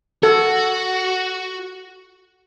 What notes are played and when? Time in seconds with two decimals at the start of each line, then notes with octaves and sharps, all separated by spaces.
0.23 F#4 A4